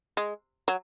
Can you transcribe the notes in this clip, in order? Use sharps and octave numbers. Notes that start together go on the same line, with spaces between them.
G#3
F#3